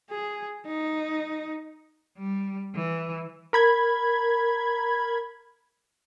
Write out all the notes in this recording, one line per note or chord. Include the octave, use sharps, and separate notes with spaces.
G#4
D#4
G3
E3
A#4 B5 G#6